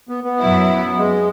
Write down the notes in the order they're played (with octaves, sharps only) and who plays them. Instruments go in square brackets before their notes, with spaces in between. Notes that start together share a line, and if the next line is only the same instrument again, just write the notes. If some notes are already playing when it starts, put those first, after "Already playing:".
[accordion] B3
B3
[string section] F#2 F#3 E4
[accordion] G#3